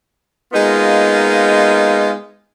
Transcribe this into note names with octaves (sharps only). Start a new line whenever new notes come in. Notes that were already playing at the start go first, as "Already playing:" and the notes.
G#3 A#3 B3 D#4 F4